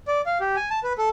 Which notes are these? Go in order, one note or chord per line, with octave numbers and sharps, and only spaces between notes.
D5
F5
G4
G#5
A5
B4
A4